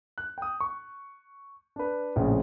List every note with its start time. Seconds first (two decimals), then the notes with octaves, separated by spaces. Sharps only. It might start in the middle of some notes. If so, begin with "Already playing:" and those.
0.18 F#6
0.38 G5 D#6
0.60 C#6
1.76 D4 B4
2.16 A#1 F2 A2 C#3